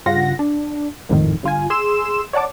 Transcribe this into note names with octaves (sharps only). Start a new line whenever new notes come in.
G2 C#3 F4 F#5 A#6
D4
G#1 F2 A2 D#3
G1 F4 G#5
G#4 C6 E6 E7
C#5 D5 F#5 A5 D6